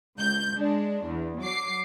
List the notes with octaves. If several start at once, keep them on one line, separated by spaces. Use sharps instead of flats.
C#2 G6
G#3 D4
E2
F#3 D6 C7